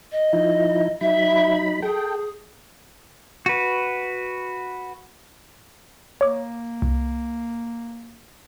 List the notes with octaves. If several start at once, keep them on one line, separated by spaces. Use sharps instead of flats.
D#5
F3 D#4 E4
F#3 D#4 E5 B5
G#4 A4 G5
F#4 B4
A#3 C#5 D6
C2